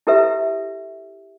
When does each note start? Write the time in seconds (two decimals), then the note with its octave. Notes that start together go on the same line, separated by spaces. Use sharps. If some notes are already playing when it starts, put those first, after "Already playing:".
0.07 E4 G4 A4 B4 E5